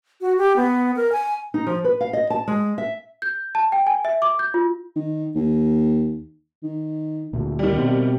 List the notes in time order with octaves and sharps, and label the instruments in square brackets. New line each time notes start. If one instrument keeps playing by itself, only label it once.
[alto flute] F#4
G4
B3
A#4
G#5
[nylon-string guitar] D#4
F3
B4
F5
D#5
A5
G#3
E5
[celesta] G6
A5
G5
G#5
E5
D6
G6
F4
[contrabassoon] D#3
D#2
D#3
[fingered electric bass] D2 A#2
[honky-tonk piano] D#3 G3
[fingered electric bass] B2 B3 C4